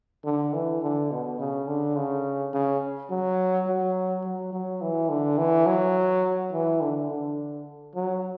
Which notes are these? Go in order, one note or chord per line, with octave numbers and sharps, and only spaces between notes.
D3
E3
D3
B2
C#3
D3
C#3
C#3
F#3
F#3
F#3
F#3
E3
D3
E3
F#3
E3
D3
D3
F#3